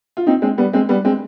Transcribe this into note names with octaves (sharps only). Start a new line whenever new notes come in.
F4
C4 D#4
G#3 C4
G3 B3
G#3 C4
G3 B3
G#3 C4